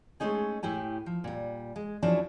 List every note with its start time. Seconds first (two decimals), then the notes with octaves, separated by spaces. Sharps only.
0.20 G#3 A3 C#4 D#4 G#4
0.63 A2 E4 G4 G#5
1.06 F3
1.24 A#2 G3
1.76 G#3
2.03 F3 F#3 C#4 D4 E4